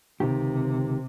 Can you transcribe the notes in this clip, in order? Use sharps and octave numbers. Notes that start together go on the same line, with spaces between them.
C#2 C3 D#3 G4